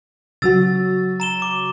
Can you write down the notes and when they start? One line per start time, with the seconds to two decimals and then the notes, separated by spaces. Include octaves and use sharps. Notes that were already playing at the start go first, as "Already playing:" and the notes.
0.42 C#3 F#3 F#4 E6 A6
1.20 A#5 E7 G7
1.42 D6